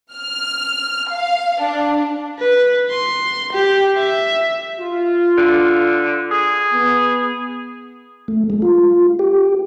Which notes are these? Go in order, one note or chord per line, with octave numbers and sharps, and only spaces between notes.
F6
F5
D4
B4
C6
G4
E5
F4
D3
G#4
B3
A3
G#3
F4
G4